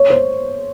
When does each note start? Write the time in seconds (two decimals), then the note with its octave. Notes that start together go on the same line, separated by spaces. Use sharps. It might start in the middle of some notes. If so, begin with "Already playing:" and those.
Already playing: C#5
0.10 C5